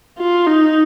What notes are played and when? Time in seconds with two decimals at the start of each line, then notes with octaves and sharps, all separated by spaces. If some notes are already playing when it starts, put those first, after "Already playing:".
0.18 F4
0.47 D#4